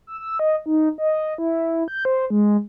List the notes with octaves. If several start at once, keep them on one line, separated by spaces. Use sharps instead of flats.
E6
E6
D#5
D#4
D#5
E4
G6
C5
G#3